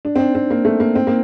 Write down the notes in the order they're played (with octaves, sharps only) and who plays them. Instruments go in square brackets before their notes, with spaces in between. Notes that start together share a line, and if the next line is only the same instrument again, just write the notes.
[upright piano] D4
C4
D4
C4
A#3
A3
A#3
C4
A#3